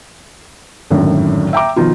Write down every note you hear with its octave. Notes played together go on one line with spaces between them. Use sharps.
G#1 F#2 A2 D3 D#3
E5 G5 A#5 D6
B2 D#3 F3 D#4 F4